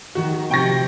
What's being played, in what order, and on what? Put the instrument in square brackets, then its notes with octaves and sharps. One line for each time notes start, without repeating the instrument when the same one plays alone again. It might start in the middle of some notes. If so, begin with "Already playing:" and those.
[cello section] D#3 [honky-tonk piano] F#4
[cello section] C3 F3 [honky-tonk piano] G5 C#6 A#6